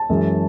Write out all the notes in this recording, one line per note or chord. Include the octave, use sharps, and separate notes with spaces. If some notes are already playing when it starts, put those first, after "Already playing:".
Already playing: A5
F#2 E3 G#3